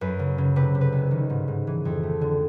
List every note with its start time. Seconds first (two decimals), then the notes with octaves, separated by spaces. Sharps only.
0.01 F#2 B4
0.19 C#3
0.38 C#3
0.56 C3 B4
0.75 C3
0.81 B4
0.93 C2
1.11 D#3
1.30 G#2
1.48 G#2
1.67 E3
1.85 F2
2.03 A3
2.21 D3